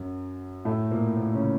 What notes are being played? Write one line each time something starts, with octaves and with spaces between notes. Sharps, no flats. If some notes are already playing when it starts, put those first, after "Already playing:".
Already playing: F#2 F#3
A2 A3
A#2 A#3
A#2 A#3
C#3 C#4